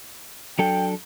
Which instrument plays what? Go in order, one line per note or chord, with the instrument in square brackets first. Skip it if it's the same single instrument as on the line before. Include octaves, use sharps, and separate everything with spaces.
[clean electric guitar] F#3 D4 A4 [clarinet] G5